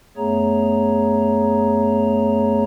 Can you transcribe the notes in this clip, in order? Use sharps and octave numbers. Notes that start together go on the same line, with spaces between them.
F#2 A3 B3 G#4 C#5 A#5